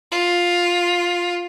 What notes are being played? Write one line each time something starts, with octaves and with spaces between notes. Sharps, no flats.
F4